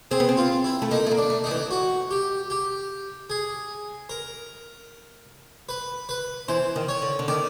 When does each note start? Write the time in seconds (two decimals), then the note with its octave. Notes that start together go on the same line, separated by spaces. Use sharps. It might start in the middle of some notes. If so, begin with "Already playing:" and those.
0.11 C4 G#4
0.20 B3
0.29 C4
0.37 F4
0.64 E4
0.82 A3
0.91 A#3 D#4
1.07 A3
1.11 A#3
1.17 D4
1.30 A3
1.44 D#3 D#4
1.51 E3
1.71 F#4
2.11 G4
2.50 G4
3.30 G#4
4.09 A#4
5.69 B4
6.09 B4
6.48 E3 C5
6.76 D#3
6.89 C#5
7.02 D3
7.19 D3
7.28 D#3 D5